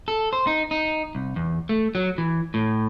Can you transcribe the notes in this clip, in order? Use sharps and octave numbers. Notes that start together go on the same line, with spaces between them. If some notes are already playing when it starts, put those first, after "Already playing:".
A4
C5
D#4
D#4
C2
E2
A3
F#3
E3
A2